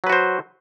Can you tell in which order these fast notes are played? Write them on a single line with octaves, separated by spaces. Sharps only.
F#3 B4 F#4 C5